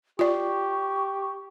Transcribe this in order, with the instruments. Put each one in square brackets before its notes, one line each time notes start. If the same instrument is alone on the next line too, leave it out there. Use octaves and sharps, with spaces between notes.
[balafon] F4 D5 [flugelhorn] G4 [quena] C#6